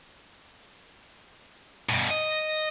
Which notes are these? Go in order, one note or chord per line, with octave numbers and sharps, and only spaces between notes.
G2 B2
D#5